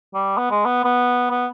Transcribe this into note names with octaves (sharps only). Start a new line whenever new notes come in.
G3
B3
G#3
B3
B3
B3